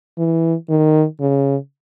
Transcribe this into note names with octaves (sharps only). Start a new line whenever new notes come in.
E3
D#3
C#3